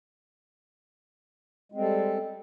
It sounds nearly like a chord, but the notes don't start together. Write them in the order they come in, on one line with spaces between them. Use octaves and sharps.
G#3 C4 G3 A4